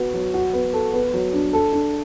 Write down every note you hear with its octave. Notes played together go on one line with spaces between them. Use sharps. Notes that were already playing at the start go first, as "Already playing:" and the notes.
Already playing: B3 F#4
F#3
F#4
B3
A4
B3
F#3
D4
A4
D4